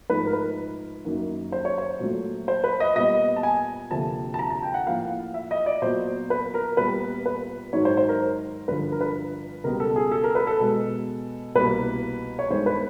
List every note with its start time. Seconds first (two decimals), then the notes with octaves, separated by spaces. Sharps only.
0.10 G#2 F3 A3 B4
0.27 A#4
0.33 B4
1.05 F#2 D#3 F#3 A#3
1.52 C5
1.65 C#5
1.78 C5
2.00 A#2 F#3 A3
2.48 C5
2.64 B4
2.80 D#5
2.96 A#2 G3 B3 D#5
3.36 A5
3.43 G#5
3.91 D2 C3 F3 A#3 A5
4.34 A5
4.39 A#5
4.50 A5
4.63 G5
4.74 F#5
4.86 A2 F3 A#3 F5
5.34 E5
5.51 D#5
5.66 D5
5.82 A#2 F#3 B3 C5
6.30 B4
6.54 A#4
6.77 A#2 G3 B3 B4
7.26 B4
7.73 G#2 D#3 F#3 C#5
7.85 C5
7.97 C5
8.09 A#4
8.68 G2 D3 F3 B4
8.92 A#4
9.01 B4
9.64 C#2 B2 G3 B3 A#4
9.80 A4
9.96 G#4
10.12 A4
10.24 A#4
10.35 B4
10.47 A4
10.60 B2 G#3 B3
11.55 C2 B2 G3 A#3 B4
12.39 C#5
12.50 G2 D#3 G#3 B3 C5
12.66 B4